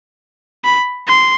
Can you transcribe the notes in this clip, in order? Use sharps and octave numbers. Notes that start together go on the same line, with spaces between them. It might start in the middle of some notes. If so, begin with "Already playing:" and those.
B5
C6